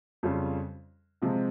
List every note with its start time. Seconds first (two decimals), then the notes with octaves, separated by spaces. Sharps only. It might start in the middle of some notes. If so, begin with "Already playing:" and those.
0.23 F2 C#3 G3 C#4 F4
1.22 C3 F3 G#3 C4